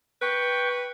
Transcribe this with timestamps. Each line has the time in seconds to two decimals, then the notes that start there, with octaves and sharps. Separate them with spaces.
0.21 B4 G5 C#6